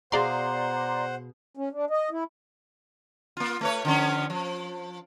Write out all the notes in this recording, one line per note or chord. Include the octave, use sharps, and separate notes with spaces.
B2 G#4 C5 D5 F5 F#5 A#5 C6
C#4
D4
D#5
E4
A#3 F4
A3 B4 C#5
D3 F3 C#4
F3